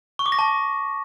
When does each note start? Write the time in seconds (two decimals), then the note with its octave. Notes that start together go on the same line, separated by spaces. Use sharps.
0.19 C#6
0.26 D6
0.32 A#6
0.39 A5